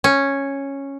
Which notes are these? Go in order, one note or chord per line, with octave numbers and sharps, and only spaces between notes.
C#4